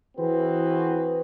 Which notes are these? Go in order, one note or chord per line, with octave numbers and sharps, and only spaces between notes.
E3 C4 F#4 G#4 B4